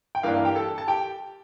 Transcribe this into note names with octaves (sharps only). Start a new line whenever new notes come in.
G5
G2 E3 A#3 D4 F5
F5
G4 G5
A4 A5
A5
G4 G5